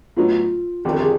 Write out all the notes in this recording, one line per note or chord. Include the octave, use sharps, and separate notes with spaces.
A2 F#3 B3 D#4 F4
G1 F2 C3 D#3 G3 G4
A4
G#4